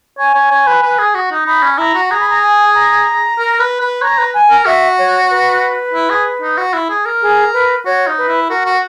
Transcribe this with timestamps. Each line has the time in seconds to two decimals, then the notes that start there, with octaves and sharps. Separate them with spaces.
0.19 C#5 G#5
0.35 C#5
0.51 C#5
0.67 B4
0.83 B4
0.99 G#4
1.15 F#4
1.32 D#4
1.46 D#4 B5
1.63 C#4
1.78 E4 A#5
1.95 F#4
2.11 G#4 A#5
2.20 B5
2.30 A#5
2.43 G#5
2.74 A#5
3.38 A#4
3.60 B4
3.81 B4
4.02 C#5 A#5
4.19 B4
4.34 G#5
4.50 A#4
4.66 F#4 E5
4.98 C#5
5.30 B4
5.94 E4
6.10 G#4
6.42 D#4
6.58 F#4
6.74 E4
6.89 G#4
7.06 A#4
7.22 G#4
7.53 B4
7.86 F#4 C#5
8.07 D#4
8.18 B4
8.28 E4
8.49 F#4 A#4
8.65 F#4